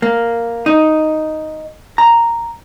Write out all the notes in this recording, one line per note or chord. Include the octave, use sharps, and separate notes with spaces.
A#3
D#4
A#5